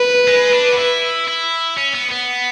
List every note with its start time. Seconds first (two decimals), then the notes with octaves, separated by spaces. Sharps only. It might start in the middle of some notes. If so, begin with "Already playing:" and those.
Already playing: B4
0.28 G#3
0.53 D4
0.72 F#4
0.78 E4
1.28 E4
1.77 C#4
1.94 B3
2.11 B3